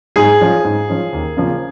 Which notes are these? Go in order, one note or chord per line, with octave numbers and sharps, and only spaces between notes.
G#2 G#4
F3 C#4
G#2
F3 C#4
D#2
C#3 F3 A#3